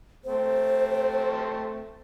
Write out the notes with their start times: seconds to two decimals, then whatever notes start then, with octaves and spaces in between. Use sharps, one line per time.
0.25 A3 C4 C5